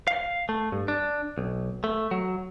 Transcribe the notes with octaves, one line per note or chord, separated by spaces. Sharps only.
F5
A3
G2
D4
B1
A3
F#3